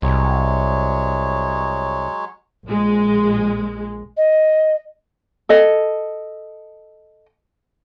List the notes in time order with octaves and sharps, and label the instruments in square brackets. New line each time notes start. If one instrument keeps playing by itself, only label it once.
[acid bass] C2 [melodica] F#3 G#3 C#5
[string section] A#1 G#3
[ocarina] D#5
[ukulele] A4 D#5